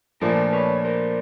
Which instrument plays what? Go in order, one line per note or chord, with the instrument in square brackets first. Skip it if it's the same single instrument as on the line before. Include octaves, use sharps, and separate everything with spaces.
[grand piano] A#2 F3 A3 D4 [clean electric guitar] A#4 C5
[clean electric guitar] B4 C#5
A#4 C5